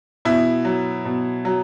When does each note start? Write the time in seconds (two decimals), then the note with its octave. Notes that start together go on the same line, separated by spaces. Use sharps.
0.25 B2 E4
0.65 F#3
1.05 B2
1.45 F#3